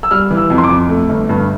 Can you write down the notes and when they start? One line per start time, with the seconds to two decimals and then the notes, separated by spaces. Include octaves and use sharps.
0.03 E6
0.11 G3 F6
0.30 E3
0.37 E6
0.50 F2
0.58 C6
0.63 D6
0.70 F2
0.89 A3
1.09 G1
1.29 G2